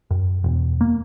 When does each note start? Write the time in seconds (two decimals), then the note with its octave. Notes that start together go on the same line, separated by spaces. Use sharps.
0.11 F#2
0.44 E1
0.81 A#3